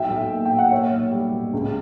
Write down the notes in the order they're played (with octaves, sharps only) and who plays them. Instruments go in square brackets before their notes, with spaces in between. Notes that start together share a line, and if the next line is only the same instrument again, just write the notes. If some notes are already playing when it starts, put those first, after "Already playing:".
Already playing: [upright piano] B1 E5 G5
B1
A#3
G5
A#2
F#5
A#3 C#5 E5
B1
G3 G4
B2
C#2